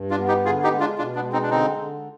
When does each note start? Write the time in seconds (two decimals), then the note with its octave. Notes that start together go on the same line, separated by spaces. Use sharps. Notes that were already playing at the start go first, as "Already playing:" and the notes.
Already playing: G2
0.10 D4 F4
0.19 B3
0.28 D#4 G4
0.45 D3 F4 G#4
0.64 D#4 G4
0.72 G#3
0.80 D4 F4
0.98 B2 D4 F4
1.15 B3 D4
1.24 G#3
1.32 C4 D#4
1.43 D4
1.50 D3 C4 D#4
1.77 D3